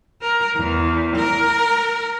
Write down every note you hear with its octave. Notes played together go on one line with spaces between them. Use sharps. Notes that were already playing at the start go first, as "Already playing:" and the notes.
A#4
E2
A#4